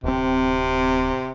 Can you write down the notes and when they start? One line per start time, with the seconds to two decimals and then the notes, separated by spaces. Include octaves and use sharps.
0.04 D1 C3 C4